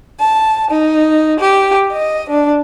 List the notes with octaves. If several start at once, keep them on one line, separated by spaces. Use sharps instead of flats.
A5
D#4
G4
D#5
D4